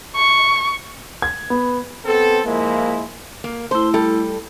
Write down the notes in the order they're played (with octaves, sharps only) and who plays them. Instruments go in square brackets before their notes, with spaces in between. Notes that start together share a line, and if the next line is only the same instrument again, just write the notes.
[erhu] C#6
[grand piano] G#6
B3
[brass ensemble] B3 C4 A4
F3 G#3 A#3 E4
[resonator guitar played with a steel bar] A#3
[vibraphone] A3 E4 [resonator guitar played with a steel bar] C5
[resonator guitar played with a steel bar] G3 A4